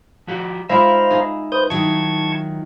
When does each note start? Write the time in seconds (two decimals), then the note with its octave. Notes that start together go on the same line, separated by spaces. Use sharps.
0.27 F3 F#4 G4
0.69 G#3 D#4 F4 C5 E5 F5 A#5 B5
1.10 D#4 G#4
1.52 B4 C5 D#6 G6
1.70 D#3 F#3 E4 A5 C#6 G#6